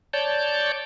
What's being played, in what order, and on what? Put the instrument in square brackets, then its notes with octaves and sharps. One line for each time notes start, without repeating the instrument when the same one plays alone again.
[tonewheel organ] C#5 D5 A5 G6